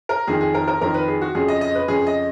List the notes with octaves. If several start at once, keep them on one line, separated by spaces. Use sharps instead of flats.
A#4
F2 D#3 G#4
G#4
A#4
A#4
F2 D#3 A#4
B4
G#4
F#4
F2 C#3 G#4
D#5
D#5
B4
F2 C#3 G#4
D#5